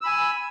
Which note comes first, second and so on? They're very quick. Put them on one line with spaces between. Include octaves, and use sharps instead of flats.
E6 B5 G#5